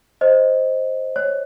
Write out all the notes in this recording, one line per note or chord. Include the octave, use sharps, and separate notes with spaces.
C5 D#5
C#5